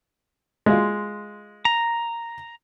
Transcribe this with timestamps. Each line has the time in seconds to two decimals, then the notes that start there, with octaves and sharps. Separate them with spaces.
0.66 G#3 F4
1.65 A#5